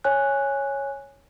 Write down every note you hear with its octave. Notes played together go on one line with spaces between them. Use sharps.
C#5 G#5 F#6